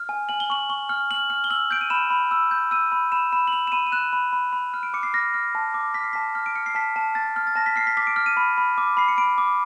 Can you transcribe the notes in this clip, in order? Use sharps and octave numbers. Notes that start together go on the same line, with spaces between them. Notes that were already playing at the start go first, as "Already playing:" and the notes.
Already playing: F6
G#5
G#5 F#7
G7
C#6 F#7
C#6 G7
F6
F6 F#7
F6
G7
E6 F#7
G6 D7
D#7
B5 E7
B5
E6
G6
E6 D#7
B5
B5 E7
B5 E7
F#7
B5 F7
E7
B5 D#7
D#7
F#6 E7
B5
B5
B5
F6
D7
D6 C#7
C7
F6 A#6
F6
A5
D6
F6 B6
C7
A5 B6
F6
D7
F6 C#7
C7
A5 B6
A5
A5 A6
F6
A6
A5 A#6
B6
F6 C7
B6
D6 B6
D7
F6
D#7
B5
B5
D6
B5 C7
C#7
B5 D7
D6